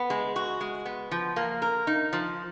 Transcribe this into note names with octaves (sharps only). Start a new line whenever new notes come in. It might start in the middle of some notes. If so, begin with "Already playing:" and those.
Already playing: B3
G#3
F#4
G#3
B3
F3
A#3
A#4
D#4
F3